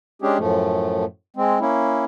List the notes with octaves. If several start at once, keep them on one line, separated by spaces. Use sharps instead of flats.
G#3 C#4 D4 G4 G#4
F#2 A2 F3 A3
G#3 C4
A#3 C#4 E4